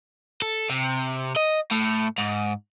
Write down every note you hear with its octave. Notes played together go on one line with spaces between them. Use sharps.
A4
C3
D#5
A2
G#2